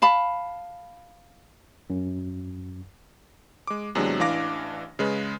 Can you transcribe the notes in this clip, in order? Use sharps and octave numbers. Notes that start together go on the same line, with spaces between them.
F5 A5 B5
F#2
G#3 D6
E2 C3 F#3 G#3 D4
A1 E3 D4 F5 D6 A#6
C#3 G#3 B4